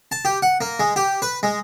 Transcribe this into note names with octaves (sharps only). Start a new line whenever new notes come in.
A5
G4
F#5
A#3
G#3
G4
B4
G#3